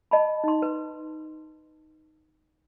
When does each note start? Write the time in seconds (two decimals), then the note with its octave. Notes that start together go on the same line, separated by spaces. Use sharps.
0.11 D#5 A5 B5
0.44 D#4 C6
0.62 B4